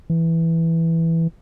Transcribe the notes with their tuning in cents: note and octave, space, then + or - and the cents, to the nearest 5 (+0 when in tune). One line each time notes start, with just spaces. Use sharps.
E3 +0